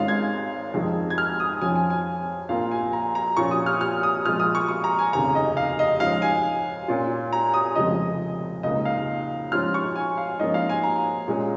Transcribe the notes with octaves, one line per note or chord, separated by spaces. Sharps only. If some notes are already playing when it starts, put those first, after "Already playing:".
Already playing: G#1 G#2 G#3 C#4 F4 F5
G#6
F2 D#3 G#3
G#6
F6
D#6
F2 F3 C#4 F4 G#5
G#5
G#5
A#1 A#2 A#3 F4 F5
G#5
A#5
A#5
A#2 F3 C#4 F4 C#6
D#6
F6
F6
D#6
A#2 F3 G#3 F4 F6
D#6
C#6
C#6
A#5
G#5
F1 D#2 C#3 A#5
D#5
F5
D#5
G#2 F3 C#4 F5
G#5
A#2 A#3 C#4 F4
A#5
D#6
F1 F2 C#3 F3 G#3 D#5
C#2 C#3 A#3 D#4 D#5
F5
G#2 F3 C#4 F4 F6
C#6
G#5
F5
G#2 F3 A#3 C#4 F4 D#5
F5
G#5
A#5
A#2 G#3 C#4